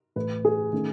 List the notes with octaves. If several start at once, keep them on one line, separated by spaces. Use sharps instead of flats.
A2 E3 A3 B4
G#4
D#3 A3 C#4